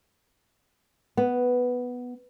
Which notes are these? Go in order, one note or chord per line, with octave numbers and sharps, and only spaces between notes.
B3